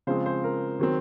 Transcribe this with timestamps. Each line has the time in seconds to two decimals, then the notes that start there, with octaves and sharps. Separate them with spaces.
0.07 C#3 F3 G#3 C4 C5
0.26 C5
0.44 A#4
0.80 D#3 F#3 C4